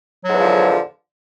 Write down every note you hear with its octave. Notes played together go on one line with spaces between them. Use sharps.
E2 G#2 D3 F3 F#3